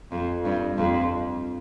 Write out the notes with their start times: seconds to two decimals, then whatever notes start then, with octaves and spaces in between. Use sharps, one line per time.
0.12 F2
0.45 G2
0.78 F2